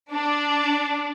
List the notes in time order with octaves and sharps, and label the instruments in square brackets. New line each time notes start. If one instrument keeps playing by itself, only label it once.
[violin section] D4